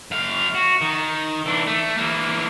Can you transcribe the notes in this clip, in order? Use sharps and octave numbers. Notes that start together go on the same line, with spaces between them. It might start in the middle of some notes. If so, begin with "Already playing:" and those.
F#2 F5
F#4
D#3
E3 D4
A3
E3 A#3